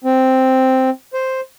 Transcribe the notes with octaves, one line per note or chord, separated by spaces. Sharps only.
C4
C5